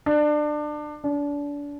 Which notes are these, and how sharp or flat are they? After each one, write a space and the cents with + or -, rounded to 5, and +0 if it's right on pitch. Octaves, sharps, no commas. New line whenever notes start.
D4 +25
D4 -30